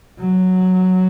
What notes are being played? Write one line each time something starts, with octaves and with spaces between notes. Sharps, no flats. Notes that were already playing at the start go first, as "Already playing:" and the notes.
F#3